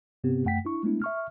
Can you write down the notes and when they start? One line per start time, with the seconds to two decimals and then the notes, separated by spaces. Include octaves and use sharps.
0.24 G2 C3 B3 C4 G4
0.45 F#2 A3 F#5 G5 B6
0.65 D4 E4 C#6
0.83 G#3 A3 B3 D4 E4
1.02 E5 C#6 F6